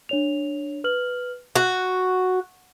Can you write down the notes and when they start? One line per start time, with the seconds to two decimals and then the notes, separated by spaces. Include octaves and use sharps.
0.09 D4 C#5 F7
0.84 B4 F6 F#7
1.56 F#4 F#6